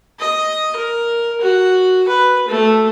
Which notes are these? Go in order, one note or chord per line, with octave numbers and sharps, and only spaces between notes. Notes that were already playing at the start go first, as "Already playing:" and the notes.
D#5
A#4
F#4
B4
A3